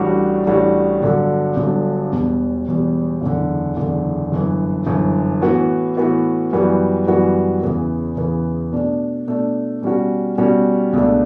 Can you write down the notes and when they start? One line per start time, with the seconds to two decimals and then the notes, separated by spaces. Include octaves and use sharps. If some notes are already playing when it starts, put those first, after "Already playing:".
Already playing: A1 A2 G3 D4 F#4
0.46 A1 A2 G3 D4 F#4
1.02 G1 G2 D3 F#3
1.56 G1 G2 D3 F#3
2.12 E1 E2 B2 G3
2.67 E1 E2 B2 G3
3.21 F#1 E2 D3
3.77 F#1 E2 D3
4.32 G1 F#2 E3
4.87 G1 F#2 E3
5.42 A2 E3 B3 F#4
5.97 A2 E3 B3 F#4
6.53 F#2 E3 G3 B3 F#4
7.07 F#2 E3 G3 B3 F#4
7.63 E2 C#3 E3 B3
8.17 E2 C#3 E3 B3
8.72 B2 A3 D4
9.28 B2 A3 D4
9.82 B2 G3 C#4 F#4
10.38 B2 G3 C#4 F#4
10.93 C#2 B2 A3 D4